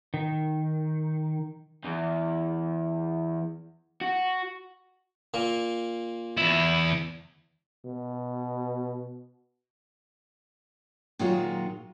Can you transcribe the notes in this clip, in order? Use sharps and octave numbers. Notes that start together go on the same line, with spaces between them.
D#3
E2
F#4
A#2 A#3
E2 E4
B2
A#2 D#3 F#3 G#3 F4 F#4